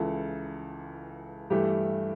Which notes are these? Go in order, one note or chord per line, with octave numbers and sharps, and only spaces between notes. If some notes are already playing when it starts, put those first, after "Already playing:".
Already playing: C#2 C#3 E3 A4
G2 E3 A3 G4